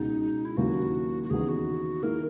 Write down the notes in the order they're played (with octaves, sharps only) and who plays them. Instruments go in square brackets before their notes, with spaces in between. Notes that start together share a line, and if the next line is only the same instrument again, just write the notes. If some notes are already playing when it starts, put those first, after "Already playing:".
Already playing: [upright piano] C#2 B2 G#3 [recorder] D#4
[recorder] E4
[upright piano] D#2 C#3 F#3 A#3 E4 [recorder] F#4
[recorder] F#4
[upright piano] D#2 C#3 E3 B3 D#4 [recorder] G#4
[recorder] F#4
[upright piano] D#3 A#3 E4 G#4 [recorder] A#4